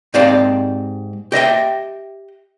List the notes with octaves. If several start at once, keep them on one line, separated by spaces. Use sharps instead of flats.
G#2 C4 G4 D5 F5 A5
G4 D#5 E5 G5